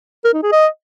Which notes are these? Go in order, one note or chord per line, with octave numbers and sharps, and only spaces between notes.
A#4
D#4
G#4
D#5